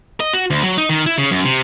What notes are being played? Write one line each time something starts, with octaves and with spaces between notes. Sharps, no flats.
D#5
F#4
D2
F#3
D#4
D#3
E4
C#3
F#2
C3